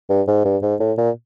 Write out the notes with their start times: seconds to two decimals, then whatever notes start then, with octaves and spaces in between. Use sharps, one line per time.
0.10 G2
0.28 G#2
0.45 G2
0.63 G#2
0.80 A2
0.98 A#2